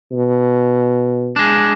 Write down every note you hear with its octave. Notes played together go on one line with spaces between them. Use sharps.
B2
G#3 D4